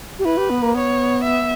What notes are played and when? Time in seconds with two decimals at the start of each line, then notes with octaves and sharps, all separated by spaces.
0.19 G4
0.25 E4 B4
0.37 G4
0.50 B3
0.62 A#3
0.75 B3 C#5
1.24 E5